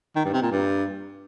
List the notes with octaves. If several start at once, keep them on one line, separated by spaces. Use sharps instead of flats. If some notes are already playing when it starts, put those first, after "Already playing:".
D#3
G2
C3
A#2
G2